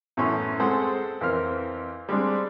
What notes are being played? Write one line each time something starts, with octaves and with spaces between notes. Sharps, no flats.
F#2 A2 E3 B3 C#4 C6
G#3 C4 G#4 A4 C5 F#5
F2 E3 C4 A#4 F6
G3 G#3 C4 D4